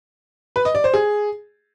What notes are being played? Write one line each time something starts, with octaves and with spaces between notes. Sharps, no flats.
B4
D#5
D5
C5
G#4